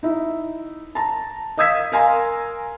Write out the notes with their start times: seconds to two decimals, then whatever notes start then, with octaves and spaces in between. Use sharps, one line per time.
0.03 D#4 E4
0.95 A5 A#5
1.58 D#5 F5 D#6 E6 G#6 B6
1.92 A#4 F5 G#5 A#5 C6